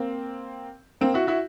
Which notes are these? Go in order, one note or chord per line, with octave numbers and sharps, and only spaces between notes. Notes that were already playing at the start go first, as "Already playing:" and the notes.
Already playing: A#3 C4
A#3 C4
E4 F#4
E4 F#4